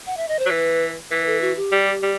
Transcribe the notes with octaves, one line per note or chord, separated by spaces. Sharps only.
F#5
E5
D#5
C5
F#3
E3 B4
E3 B4
A4
F#4
G4
G3
G3